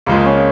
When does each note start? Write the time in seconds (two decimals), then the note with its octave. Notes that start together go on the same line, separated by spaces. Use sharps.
0.06 C#2 C#3 F3 G#3 A#3
0.25 C#4